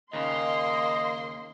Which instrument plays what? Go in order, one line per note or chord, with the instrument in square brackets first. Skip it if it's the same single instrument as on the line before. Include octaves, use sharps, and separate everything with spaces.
[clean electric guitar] D#2 C#3 [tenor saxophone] A#3 [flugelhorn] D#5 [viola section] C6